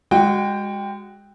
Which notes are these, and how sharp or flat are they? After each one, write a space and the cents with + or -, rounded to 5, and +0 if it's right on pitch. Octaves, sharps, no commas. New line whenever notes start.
G#3 -25 F#4 +0 G5 +10